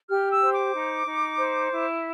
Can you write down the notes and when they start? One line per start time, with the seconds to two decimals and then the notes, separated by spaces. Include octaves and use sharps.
0.10 G4 F6
0.31 E6
0.42 C5
0.53 D6
0.74 D#4
1.07 D#4
1.39 C5
1.71 E4